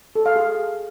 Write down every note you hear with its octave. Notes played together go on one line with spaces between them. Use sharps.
A4
F5
G#4